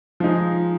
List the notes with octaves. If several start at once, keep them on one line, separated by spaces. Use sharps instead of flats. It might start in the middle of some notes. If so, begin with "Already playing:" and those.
F3 G#3 D#4 G#4